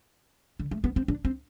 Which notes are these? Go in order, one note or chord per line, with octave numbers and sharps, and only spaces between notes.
D3
A3
B3
C4
D4
C4